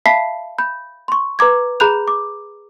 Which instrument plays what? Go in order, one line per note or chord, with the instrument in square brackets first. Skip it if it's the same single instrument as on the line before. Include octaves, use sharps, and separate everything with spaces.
[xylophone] E5 F5 A5 B5 B6 C7
B5 G6
C6 C#6
B4 A#5 D6 G#6
G#4 A#5 B5 F#6 G6 F7
D6